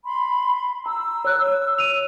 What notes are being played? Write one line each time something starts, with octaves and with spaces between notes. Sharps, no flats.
B5 C6
A#5 E6
C#5 F#6
D#7 F7